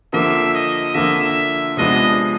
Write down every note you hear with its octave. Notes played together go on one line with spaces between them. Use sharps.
D3 F3 A#3 E5
D#5
D3 F3 A#3 E5
C3 F3 G#3 B3 D4 D#5